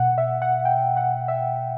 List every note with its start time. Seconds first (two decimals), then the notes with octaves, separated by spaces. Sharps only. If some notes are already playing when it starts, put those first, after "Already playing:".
Already playing: B2 F#5
0.18 E5
0.42 F#5
0.65 G5
0.97 F#5
1.28 E5